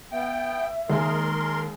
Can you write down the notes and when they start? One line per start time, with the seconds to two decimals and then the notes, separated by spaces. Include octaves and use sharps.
0.12 B3 E5 G5
0.90 D#2 G#3 G#4 A#4 C6